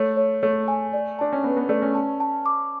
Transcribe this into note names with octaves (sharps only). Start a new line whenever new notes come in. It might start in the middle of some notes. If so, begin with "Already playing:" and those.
Already playing: A3 C#5
C#5
A3 C#5
G#5
D5
D4 A5
C#4
B3 B4
B3
A3 D5
C#4
A5
A5
D6